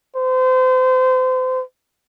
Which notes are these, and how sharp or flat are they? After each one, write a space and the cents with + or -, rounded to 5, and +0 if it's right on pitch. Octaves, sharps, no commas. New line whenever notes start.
C5 -35